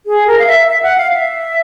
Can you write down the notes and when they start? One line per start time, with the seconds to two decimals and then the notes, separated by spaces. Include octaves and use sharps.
0.06 G#4
0.27 A#4
0.39 F5
0.47 E5
0.67 E5
0.83 F#5
0.98 F5
1.13 E5